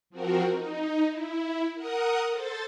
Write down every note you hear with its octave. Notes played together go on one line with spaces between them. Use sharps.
F3 C4 F#4 A#4
D#4
E4
A#4 F#5 D#6
A4 C5 A5